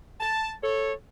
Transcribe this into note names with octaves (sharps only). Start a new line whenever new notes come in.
A5
A4 C#5